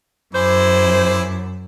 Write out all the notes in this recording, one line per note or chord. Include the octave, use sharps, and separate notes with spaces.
F#2 E4 G#4 C5 D6